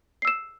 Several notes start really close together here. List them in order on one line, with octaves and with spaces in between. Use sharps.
C7 E6 E7